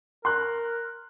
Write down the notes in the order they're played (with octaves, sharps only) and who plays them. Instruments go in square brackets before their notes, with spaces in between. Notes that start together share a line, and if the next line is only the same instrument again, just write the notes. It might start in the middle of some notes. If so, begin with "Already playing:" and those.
[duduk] A#4 [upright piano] C6 F#6